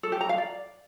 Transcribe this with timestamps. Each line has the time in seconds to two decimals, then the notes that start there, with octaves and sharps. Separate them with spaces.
0.03 A4
0.12 G4
0.21 A#5
0.29 F5
0.38 D5